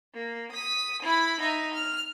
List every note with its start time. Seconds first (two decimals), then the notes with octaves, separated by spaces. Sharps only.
0.14 A#3
0.52 D#6 B6
1.02 E4 B5
1.40 D#4 E5
1.74 F6